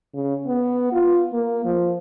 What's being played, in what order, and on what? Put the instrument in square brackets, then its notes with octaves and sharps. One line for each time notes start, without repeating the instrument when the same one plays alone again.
[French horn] C#3
B3
F4
A#3
F3